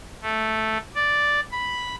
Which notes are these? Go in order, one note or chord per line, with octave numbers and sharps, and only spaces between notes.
A3
D5
B5